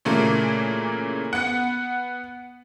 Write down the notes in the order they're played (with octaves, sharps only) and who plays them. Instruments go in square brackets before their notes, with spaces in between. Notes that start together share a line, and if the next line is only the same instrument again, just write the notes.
[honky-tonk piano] A#2 C#3 E3 A3 A#3
B3 F#5